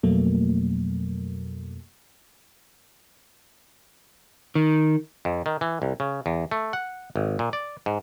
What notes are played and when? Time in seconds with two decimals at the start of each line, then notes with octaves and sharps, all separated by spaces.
0.03 F2 B2 F#3 A3 A#3
4.55 D#3
5.25 F2
5.46 D#3
5.61 E3
5.82 C2
6.00 C#3
6.26 E2
6.51 A3
6.73 F#5
7.16 G#1
7.39 A#2
7.53 D5
7.86 G#2